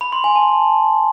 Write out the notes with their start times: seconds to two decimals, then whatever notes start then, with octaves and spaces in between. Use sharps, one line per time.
0.01 B5
0.12 C6
0.24 G#5
0.36 A5